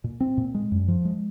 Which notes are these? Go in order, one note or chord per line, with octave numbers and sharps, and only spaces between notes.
A#2
C4
A#2
G#3
F#2
F3
G#3